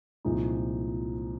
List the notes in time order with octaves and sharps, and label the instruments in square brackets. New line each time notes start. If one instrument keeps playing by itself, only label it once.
[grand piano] C2 A#2 F3 G#3 D#4